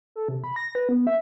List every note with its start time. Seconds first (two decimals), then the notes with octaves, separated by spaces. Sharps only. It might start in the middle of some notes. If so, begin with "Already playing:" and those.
0.16 A4
0.29 C3
0.44 B5
0.56 A#6
0.75 B4
0.89 B3
1.07 E5